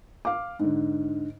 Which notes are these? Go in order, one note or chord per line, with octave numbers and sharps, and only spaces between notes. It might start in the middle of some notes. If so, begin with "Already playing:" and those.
F5 D6
G#2 D3